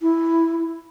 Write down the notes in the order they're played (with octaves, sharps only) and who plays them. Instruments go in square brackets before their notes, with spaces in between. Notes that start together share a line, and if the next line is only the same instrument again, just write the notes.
[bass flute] E4